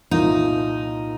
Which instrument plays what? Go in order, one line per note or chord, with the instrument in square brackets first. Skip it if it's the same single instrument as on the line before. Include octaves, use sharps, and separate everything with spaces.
[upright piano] C2 A#2 F3 A#3 F4 [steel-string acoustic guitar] D#4